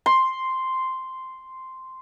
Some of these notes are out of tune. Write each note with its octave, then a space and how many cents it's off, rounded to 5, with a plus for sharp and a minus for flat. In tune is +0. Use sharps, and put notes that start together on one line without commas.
C6 -5